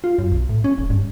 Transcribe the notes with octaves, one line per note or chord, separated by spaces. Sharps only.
F4
F#2
B1
A2
C#4
D#1
G2